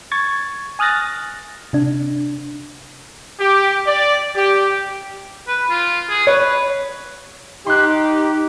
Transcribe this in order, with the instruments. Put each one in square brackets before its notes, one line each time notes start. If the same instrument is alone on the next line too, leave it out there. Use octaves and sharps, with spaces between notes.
[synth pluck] C#6 G#6 A6
G#5 D#6 F6 F#6 A6 A#6
C3 D4
[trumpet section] G4
D5
G4
[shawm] B4
F4
G#4
[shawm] B4 [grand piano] C#5
[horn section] D#4 G4 [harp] C6 F#6